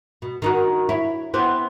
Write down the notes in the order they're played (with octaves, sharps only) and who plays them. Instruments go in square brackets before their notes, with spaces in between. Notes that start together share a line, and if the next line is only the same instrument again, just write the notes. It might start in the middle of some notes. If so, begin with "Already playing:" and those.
[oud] B2
D#3 D#4 F#4
E4 C#5
E3 B3 C4